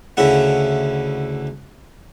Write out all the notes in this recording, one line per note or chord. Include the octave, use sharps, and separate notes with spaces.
D2 C#3 E4 F#5